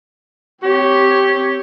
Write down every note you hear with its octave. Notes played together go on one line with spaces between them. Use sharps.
C4 G4 C#5